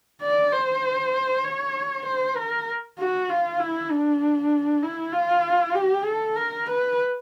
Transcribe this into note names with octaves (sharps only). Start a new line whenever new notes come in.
D5
C5
C#5
C5
A#4
F#4
F4
E4
D4
E4
F4
G4
A4
A#4
B4